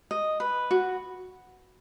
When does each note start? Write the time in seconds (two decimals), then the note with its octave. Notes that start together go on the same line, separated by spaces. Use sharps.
0.11 D#5
0.40 B4
0.71 F#4